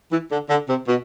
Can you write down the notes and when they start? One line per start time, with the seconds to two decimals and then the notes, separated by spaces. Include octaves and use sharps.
0.11 E3
0.31 D3
0.50 D3
0.69 C3
0.87 B2